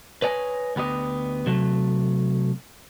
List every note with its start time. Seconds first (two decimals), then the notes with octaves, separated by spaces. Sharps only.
0.22 B4 C#5 D#5 G#5
0.76 D2 B3 G4 D#5
1.46 C3 F#3 A3